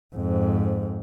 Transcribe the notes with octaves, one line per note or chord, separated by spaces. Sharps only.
F2 G#2